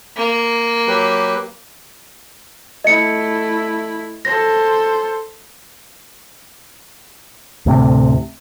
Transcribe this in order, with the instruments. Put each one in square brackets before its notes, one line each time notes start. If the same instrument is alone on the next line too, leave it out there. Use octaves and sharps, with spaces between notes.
[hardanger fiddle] A#3
[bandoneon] F#3 G4 B4
[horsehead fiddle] A3 E4 [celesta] D#5 C#7
[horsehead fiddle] A4 C5 [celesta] A#6
[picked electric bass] D2 A2 C3